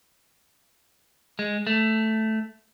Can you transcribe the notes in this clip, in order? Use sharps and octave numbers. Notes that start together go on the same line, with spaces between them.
G#3
A3